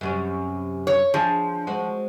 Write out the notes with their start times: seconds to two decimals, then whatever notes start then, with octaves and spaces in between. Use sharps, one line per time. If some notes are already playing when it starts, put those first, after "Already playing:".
0.01 F#2 C3 C#4
0.87 C#5
1.14 F3 D4 G#4
1.67 G#3 C4 F#4